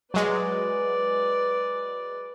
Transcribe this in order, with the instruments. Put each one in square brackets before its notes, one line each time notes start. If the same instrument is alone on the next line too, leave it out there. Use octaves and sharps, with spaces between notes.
[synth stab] F#3 G#3 [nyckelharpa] B4 D5